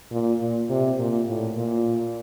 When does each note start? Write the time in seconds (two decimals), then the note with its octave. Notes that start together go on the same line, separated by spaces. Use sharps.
0.12 A#2
0.41 A#2
0.69 C3
0.99 A#2
1.28 A2
1.57 A#2